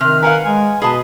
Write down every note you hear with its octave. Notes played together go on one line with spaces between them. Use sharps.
C3 D#3 F6
A#4 B4 F5 F#5 G#5
G#3 G#5
B2 G#4 B4 D#5 A5